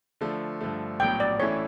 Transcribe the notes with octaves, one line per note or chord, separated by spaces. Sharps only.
D3 F3 A3
G2 D3 F3 A3
A#1 A2 F#3 B3 G5
D5
A2 E3 A3 C#4 E4 C#5